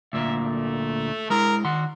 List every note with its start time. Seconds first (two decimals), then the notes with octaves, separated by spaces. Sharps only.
0.13 D2 A#2 A#3 E5
0.46 A3
1.30 G#3 E4 A#4
1.65 D#3 F#4 C6